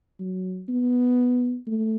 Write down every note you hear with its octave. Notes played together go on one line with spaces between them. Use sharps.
F#3
B3
A3